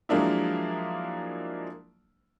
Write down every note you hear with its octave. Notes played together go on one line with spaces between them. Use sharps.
F3 F#3 G#3 A#3 D4 E4